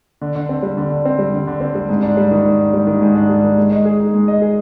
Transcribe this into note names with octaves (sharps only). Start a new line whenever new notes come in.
D3
D3
C4
G3
D3
D3
C4
G3
D3
D3
C4
G3
G#2
D4
G3
D#3
G#2
D4
G3
D#3
G#2
D4
G3
D#3
G#3
D#5
G#4
D#4
G#3
D#5
G#4